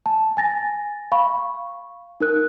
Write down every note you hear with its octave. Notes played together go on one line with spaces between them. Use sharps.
A5
G#5 A6 A#6
F5 B5 C#6
D#4 A#4 F#6